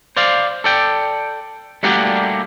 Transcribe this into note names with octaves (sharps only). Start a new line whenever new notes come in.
C5 D5 F5
A4 D5 G5
G3 A3 A#3 D4 F#4 G4